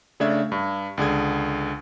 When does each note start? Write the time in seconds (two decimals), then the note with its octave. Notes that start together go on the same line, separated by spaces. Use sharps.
0.20 C#3 A3 D4 E5 G#6
0.52 G2
0.98 C#2 D3 G#4 G#6